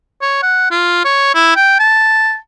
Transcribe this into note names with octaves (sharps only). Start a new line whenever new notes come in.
C#5
F#5
F4
C#5
E4
G5
A5